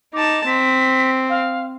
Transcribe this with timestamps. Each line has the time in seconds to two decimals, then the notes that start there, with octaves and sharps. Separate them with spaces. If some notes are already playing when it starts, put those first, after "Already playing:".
0.14 D#4 A5 D6
0.47 C4 B6
1.29 F5